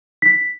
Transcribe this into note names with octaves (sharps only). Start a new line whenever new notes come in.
B6